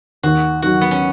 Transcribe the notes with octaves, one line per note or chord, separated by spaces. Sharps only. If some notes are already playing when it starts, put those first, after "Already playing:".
D#2 F#4
D#3 F#3 F#4
B3
C#4